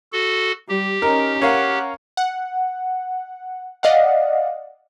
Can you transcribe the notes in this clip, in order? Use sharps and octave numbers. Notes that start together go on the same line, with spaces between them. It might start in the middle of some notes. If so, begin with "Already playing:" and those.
F#4 A4
G3 G4
C#4 D#4 A#4
C#4 A#4 F5 F#5
F#5
D5 D#5 F5 F#5